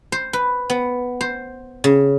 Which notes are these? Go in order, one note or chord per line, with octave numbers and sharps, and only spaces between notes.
C5
B4
B3
C5
C#3